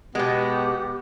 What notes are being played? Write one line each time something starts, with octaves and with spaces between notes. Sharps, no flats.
B2 G#3 B3 G4